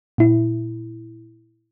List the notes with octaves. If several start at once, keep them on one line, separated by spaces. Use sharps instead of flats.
A#2 E4